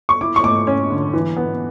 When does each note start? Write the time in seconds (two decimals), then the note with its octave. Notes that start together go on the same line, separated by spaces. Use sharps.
0.09 C#6
0.21 E4 D6
0.36 C#6
0.44 A3 D6
0.67 C#4
0.90 D3
1.13 E3
1.37 B3